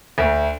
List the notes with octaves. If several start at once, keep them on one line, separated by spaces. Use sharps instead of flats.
D2